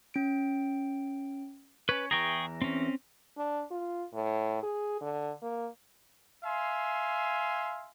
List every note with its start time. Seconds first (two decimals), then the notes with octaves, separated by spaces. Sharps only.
0.14 C#4 D7
1.89 C#4 B4 C#5
2.11 E2 E3 G#4 G5 A#5 C#6
2.62 C4 C#4
3.37 D4
3.71 F4
4.13 A2
4.63 G#4
5.01 D3
5.42 A#3
6.44 E5 F5 G#5 C6